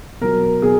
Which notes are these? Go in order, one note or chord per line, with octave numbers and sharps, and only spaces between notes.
B2 F#3 A#4
B2 G#4